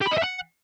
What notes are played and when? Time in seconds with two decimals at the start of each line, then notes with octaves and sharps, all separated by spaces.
0.02 G4
0.07 B5
0.13 D#5
0.18 E5
0.24 F#5